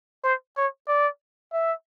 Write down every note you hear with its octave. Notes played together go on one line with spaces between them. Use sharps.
C5
C#5
D5
E5